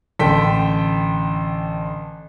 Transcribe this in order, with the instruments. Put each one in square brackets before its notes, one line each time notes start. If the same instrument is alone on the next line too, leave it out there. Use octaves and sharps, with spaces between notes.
[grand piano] A1 D3 A4 G5 B6